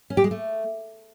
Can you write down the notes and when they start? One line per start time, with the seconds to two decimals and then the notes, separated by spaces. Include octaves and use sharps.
0.10 C#4
0.17 G4
0.24 G#3
0.31 A3